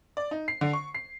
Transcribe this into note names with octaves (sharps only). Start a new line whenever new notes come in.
D5
D#4
C7
D3
C#6
C7